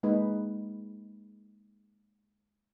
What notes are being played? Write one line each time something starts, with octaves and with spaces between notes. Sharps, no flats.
G#3 A#3 D#4 G#4 B4